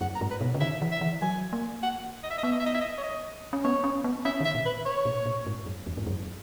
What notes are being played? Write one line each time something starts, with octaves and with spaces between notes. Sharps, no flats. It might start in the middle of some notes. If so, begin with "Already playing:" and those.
F#2 F#5
A#5
G#2
B4
B2
C#3
D#3 E5
E3
E5
E3
F#3 G#5
A#3
F#5
D#5
E5
D#5
B3 E5
D#5
E5
D#5
E5
D#5
C#5
D#5
C#4
B3 C#5
C#4
B3
C#4 E5
D#3
E5
A#2
B4
C#5
A#2
A#2
G#2
F#2
E2
G#2
F#2